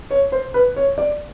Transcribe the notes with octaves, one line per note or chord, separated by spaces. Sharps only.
C#5
C5
B4
C#5
D5